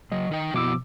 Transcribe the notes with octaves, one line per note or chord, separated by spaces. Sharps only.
C#3 F#3 D#5
D#3 D#4 G5
B2 F3 B3 E4 D6 E6